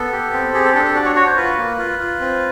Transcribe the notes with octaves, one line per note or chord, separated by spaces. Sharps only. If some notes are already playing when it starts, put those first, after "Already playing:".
Already playing: B3 A4
G4
C4
G4 G#4
A4
D4 A4
A4
F#4 D5
C#5
F#4 C#5
C5
F4 B4
A#3
F4
F4
C4